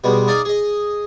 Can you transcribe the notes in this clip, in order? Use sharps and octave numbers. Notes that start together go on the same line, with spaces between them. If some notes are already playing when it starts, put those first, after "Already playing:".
B2 G3 G#3
D#4 G#4 D5 D#5 F5
G#4 D#5